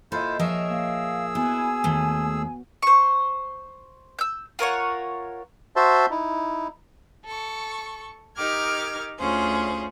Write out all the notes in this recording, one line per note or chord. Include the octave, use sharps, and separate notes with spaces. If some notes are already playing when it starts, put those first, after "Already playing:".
A#2 E4 F4 A4 C5 D#5
F3 G#4 A#4 C#5 D#5 E5 E6
A#3 F5
B3 E4 F#4 G#5
D#2 A3
C5 C#6
E6 G6
F4 A#4 C#5 F#5
F#4 C5 E5 A5 C6
D#4 E4
A4 C#6
D#4 G4 A#4 D6 F6 G#6
D2 C#4 F4 G#4 C5